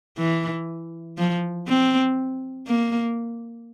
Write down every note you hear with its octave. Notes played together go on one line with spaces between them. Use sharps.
E3
F3
C4
A#3